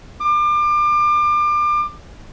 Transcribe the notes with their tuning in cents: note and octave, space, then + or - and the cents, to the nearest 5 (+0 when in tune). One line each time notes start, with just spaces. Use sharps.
D6 +30